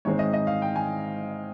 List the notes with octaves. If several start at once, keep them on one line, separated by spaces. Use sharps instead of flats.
G#2 D#3 G#3 C4 C#5
D#5
D#5
F5
G5
G#5